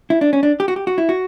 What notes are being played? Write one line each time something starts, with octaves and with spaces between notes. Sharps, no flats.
E4
D4
C#4
D4
G4
F#4
G4
F#4
E4
F#4